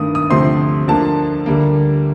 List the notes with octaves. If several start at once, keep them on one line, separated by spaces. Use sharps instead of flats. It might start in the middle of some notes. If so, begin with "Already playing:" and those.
Already playing: G2 D#3 A3 D#6
D#6
D2 C3 F3 A3 C4 C6
D2 D3 F3 A#3 A5
D2 D3 G3 A#3